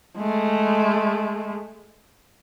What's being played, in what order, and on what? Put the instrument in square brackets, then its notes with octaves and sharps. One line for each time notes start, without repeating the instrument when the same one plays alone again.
[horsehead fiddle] G#3 A3